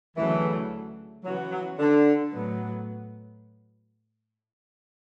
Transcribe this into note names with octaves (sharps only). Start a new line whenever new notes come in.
D2 C#3 E3 F#3 A3
C#3 E3 F#3 B3 F#4
F#3
D3
A2 F#3 B3